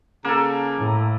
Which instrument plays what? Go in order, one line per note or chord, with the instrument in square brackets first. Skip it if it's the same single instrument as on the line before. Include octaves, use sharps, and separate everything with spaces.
[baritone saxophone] C#3 [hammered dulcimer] A#3 A4 [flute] A#5
[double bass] A2